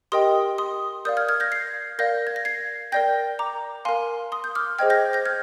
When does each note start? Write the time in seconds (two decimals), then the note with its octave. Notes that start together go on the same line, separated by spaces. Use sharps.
0.12 G4 A#4 D#5 G5 C6 D#6
0.58 C6 D#6
1.05 A#4 D5 F5 D#6 G6
1.17 F6 G#6
1.29 F6 G#6
1.40 G6 A#6
1.52 G#6 C7
1.99 A#4 D5 F5 G6 A#6
2.27 G#6
2.36 A#6
2.45 G#6 C7
2.92 A#4 D5 G5 G6 A#6
3.39 A#5 D6
3.85 A#4 F5 G#5 C6
4.32 C6 D#6
4.44 G6
4.55 D6 F6
4.79 G#4 C5 D#5 G5 F6 G#6
4.90 G6 A#6
5.13 G6 A#6
5.26 F6 G#6